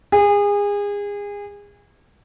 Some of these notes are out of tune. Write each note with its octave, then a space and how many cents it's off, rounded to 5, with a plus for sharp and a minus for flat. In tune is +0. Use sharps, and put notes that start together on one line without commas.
G#4 -30